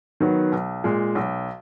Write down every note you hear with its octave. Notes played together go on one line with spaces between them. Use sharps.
D#3 F#3 B3
B1
A#2 G#3
B1